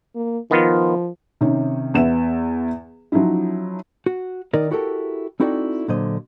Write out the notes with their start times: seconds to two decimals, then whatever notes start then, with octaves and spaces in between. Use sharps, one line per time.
0.15 A#3
0.51 D#3 F3 B3 F4
1.41 C3 D#3 C#4 D#4
1.94 E2 B4 E5 F#5 E7
3.12 F3 F#3 C#4 D#4 E4
4.06 F#4
4.53 D#3 D#4 A#4 D5 D#5
4.71 E4 F#4 G4 A4 A#4
5.40 C4 D#4 E4 F#4 A4 D5
5.88 A#2 D3 F#3 C5 D#5